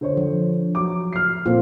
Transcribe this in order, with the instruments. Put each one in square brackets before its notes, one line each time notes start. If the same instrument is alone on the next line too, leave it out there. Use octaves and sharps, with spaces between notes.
[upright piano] D3 C5 C#5
[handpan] F3
[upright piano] F#3 D6
F6 C7
[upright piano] A#2 C4 A4 [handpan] F4